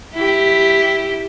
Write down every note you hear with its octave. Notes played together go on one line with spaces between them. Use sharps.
E4 G4